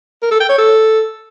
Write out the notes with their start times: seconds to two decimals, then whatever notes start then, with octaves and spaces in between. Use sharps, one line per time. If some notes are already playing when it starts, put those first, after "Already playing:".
0.22 A#4
0.31 A4
0.40 G5
0.49 C#5
0.58 A4